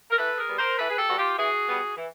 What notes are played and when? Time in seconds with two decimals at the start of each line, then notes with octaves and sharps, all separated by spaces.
0.11 A#4
0.18 E3 A4 B4
0.38 G#4 A#4
0.48 G3 B3
0.58 A#4 C5
0.78 E3 A4 B4
0.89 G#4
0.97 G4 A4
1.08 G3 B3 F#4
1.18 F4 G4
1.37 E3 F#4 G#4
1.68 G3 B3
1.96 E3